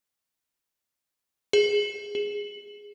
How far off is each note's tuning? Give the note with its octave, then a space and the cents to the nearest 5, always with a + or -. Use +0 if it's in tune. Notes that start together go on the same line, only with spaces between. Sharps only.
G#4 -5
G#4 -10